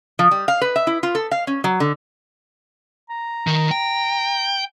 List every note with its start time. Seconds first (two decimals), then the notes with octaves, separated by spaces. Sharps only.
0.19 F3
0.31 G3
0.48 F5
0.61 B4
0.76 E5
0.87 E4
1.03 F4
1.15 A4
1.31 F5
1.47 C#4
1.64 F#3
1.80 D3
3.09 A#5
3.47 D#3
3.71 G5